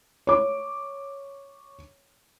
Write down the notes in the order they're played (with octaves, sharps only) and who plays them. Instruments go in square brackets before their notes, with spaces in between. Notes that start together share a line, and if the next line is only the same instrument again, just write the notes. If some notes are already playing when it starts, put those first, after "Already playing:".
[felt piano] C#5 D6